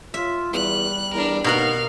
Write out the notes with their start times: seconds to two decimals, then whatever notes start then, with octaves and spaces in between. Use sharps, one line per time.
0.14 F4 E5
0.53 E2 G3 F#6
1.14 E2 D4 A#4
1.44 D#2 B2 B3 A#4 F5 F#5